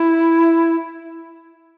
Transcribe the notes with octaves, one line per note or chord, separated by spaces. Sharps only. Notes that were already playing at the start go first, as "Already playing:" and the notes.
Already playing: E4